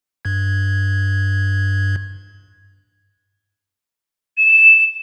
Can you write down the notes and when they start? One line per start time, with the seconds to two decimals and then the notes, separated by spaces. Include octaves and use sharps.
0.25 G2 G#6
4.37 E7